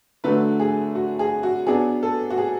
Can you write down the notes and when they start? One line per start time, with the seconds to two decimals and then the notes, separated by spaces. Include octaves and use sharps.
0.24 D3 F#3 A3 B4
0.60 G#4
0.95 F#4
1.19 G#4
1.43 F#4
1.67 F#3 B3 D4 G#4
2.03 A4
2.30 F#4
2.38 G#4